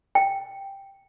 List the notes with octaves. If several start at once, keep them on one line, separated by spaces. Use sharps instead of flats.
G5